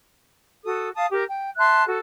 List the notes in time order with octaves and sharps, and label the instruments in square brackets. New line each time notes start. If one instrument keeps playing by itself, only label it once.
[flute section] F#4 A4 D#6
F5 A5 D#6
G4 A#4
G5
E5 A5 C6 F#6
F#4 A4